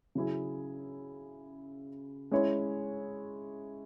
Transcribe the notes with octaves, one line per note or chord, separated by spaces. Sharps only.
C#3 F#3 E4 G#4
G#3 C#4 E4 C#5